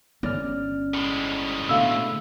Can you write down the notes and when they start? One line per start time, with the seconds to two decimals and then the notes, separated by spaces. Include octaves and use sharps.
0.23 G1 C#4 D5 F6
0.94 A2 G#3
1.69 B2 D3 A3 F5 E6